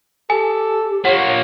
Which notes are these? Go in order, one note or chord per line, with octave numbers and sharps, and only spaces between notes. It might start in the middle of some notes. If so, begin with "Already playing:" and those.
G4 A4 G#5
F3 A#3 C#5 F#5